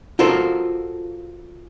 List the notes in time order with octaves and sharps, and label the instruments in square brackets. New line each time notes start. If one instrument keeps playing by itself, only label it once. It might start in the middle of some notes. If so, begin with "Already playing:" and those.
[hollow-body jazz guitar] F4 F#4 A4 A#4 C5